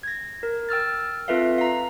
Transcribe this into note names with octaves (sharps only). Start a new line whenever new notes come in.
G#6 A#6
A#4
G5 E6 F6 A6
C4 F4 A4 B4 E5 F5
F5 A#5